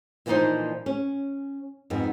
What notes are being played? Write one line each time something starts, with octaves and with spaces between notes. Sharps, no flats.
A#2 E3 F3 D4 D#4 C5
C#4
F2 G#2 B3